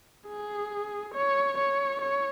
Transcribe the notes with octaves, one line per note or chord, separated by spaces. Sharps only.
G#4
C#5
C#5
C#5